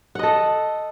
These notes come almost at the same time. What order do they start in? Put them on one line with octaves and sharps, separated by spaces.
F#5 D#5 A4